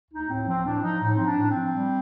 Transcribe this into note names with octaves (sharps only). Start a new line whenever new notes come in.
D2 D#4
A2 C4
F3 C4
A2 D4
F3 D#4
A2 D#4
F3 C4
D4
A2
C4
F3
G3